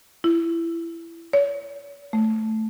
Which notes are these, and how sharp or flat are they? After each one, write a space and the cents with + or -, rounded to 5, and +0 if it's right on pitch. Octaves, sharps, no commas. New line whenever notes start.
E4 +20
C#5 +40
A3 +0